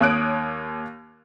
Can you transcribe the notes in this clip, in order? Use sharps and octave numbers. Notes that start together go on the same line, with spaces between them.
D#2 C#5 D#6 F#6 D7